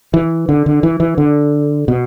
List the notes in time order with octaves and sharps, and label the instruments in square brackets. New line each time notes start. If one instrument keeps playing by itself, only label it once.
[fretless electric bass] E3
D3
D3
E3
E3
D3
B2